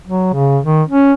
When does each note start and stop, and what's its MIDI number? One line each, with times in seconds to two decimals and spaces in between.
0.07 0.30 54
0.33 0.58 49
0.64 0.83 51
0.88 1.12 61